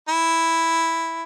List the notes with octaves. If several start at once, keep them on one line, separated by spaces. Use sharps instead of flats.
E4